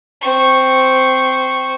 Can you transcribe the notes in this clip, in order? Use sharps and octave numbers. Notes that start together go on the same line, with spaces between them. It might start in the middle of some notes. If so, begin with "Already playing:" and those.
C4 C#6